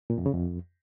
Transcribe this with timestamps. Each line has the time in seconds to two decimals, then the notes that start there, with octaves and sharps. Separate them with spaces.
0.10 A#2
0.18 F2
0.26 C#3
0.34 F2